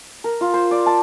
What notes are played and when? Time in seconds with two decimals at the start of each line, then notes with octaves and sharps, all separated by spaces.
0.24 A#4
0.41 F4
0.54 C5
0.71 D5
0.86 A5